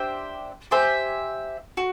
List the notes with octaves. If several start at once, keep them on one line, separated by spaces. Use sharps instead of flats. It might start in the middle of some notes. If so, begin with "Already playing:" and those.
Already playing: D4 G4 C5 E5
G4 C5 E5 G#5
F#4